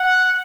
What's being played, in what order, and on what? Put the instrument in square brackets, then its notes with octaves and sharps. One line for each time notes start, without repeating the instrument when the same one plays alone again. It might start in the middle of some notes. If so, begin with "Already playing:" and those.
Already playing: [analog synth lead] F#5